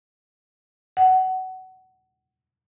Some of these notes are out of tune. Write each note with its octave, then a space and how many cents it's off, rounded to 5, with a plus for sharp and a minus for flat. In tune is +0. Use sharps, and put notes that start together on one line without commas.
F#5 +20